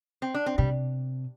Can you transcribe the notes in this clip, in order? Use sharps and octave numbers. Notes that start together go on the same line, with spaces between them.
C4
D4
C4
C3 G3